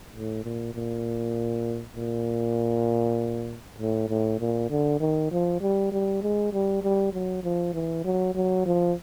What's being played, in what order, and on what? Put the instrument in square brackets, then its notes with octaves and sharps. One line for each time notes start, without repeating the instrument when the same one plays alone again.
[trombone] A2
A#2
A#2
A#2
A2
A2
A#2
D3
D#3
F3
G3
G3
G#3
G3
G3
F#3
F3
E3
F#3
F#3
F3